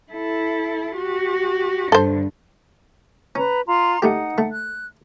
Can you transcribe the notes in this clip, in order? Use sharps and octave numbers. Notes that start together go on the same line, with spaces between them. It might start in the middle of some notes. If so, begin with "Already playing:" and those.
E4 A4
F#4 G4
G2 D3 A4 C5
C#4 B4 A#5
F4 A#5 C6
D3 A3 D#4 G4 F#5
A3
F#6